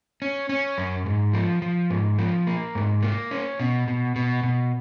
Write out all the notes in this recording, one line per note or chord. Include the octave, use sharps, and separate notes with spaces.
C#4
C#4
F#2
G#2
F3
F3
G#2
F3
A#3
G#2
A#3
C#4
B2
B2
B2
B2